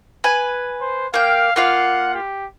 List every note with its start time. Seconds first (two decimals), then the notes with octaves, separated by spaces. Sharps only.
0.24 B4 G#5
0.81 C5
1.14 A#3 F5 G5
1.56 A#3 F4 F5 F#5
2.14 G4